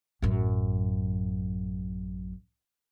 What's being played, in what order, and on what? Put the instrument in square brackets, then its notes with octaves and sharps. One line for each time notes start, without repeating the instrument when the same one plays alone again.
[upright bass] A1 F#2